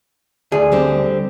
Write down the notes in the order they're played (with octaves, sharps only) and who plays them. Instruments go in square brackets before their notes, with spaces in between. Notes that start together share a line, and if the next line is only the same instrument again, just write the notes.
[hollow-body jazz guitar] D2 G#4
[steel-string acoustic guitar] D3 G3 C4